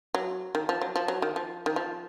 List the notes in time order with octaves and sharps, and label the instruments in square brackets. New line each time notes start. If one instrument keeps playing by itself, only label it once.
[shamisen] F#3
D#3
F3
F#3
F3
F#3
D#3
F3
D#3
F3